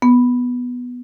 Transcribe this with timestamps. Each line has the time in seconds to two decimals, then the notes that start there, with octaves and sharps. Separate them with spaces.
0.02 B3